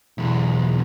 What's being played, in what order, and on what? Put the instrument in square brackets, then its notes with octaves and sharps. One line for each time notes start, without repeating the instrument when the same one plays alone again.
[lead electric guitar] B1 E2